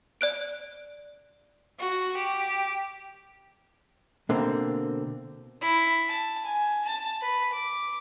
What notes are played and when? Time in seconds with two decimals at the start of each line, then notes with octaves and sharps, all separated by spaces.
0.21 D5 F#6 D7
1.80 F#4
2.17 G4
4.29 B2 D3 A#3 C4
5.61 E4
6.08 A5
6.46 G#5
6.85 A5
7.21 B4
7.53 D6